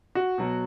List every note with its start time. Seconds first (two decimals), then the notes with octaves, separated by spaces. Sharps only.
0.15 F#4
0.38 B2 F#3